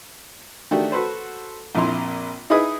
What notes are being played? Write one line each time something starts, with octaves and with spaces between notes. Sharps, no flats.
D#3 A3 D4 F#4 G4
F#4 A4 B4 C5
A#1 F2 A#2 E4 A#5 C6
D#4 E4 G#4 B4 D#5 D#6